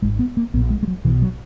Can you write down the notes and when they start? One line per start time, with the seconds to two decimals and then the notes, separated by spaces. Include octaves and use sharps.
0.02 G#1 G#2 G#3
0.19 B3
0.37 A#3
0.54 A#1 A#2 B3
0.70 G#3
0.83 G#3
0.88 F#3
1.05 B1 B2 E3
1.22 F#3